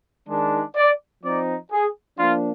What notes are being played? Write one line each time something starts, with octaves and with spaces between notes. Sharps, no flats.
D#3 G#3 D4
D5
F3 C4 D#4 D5
G#4
F3 A#3 D4 F4